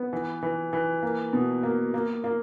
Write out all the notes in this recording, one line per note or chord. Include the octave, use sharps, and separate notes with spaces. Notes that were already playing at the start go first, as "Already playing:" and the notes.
Already playing: B3
E3
E3
E3
A#3
B2
A#3
A#3
A#3